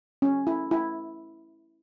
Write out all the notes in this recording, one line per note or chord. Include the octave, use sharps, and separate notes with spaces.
C#4
E4
E4